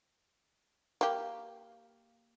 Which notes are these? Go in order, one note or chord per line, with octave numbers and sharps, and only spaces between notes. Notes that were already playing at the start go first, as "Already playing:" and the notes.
A#3 G4